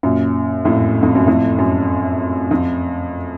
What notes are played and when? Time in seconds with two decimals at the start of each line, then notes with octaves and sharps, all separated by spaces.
0.03 F#2 A#2
0.65 F2 A2
1.03 F2
1.15 F#2
1.27 F2 A2
1.58 F#2
2.51 F2